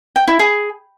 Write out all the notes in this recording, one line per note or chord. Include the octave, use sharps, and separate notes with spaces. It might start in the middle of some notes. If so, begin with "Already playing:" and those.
G5
E4
G#4